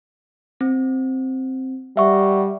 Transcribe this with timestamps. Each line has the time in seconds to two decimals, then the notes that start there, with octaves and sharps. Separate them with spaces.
0.61 C4
1.97 G3 E5 F#5 C#6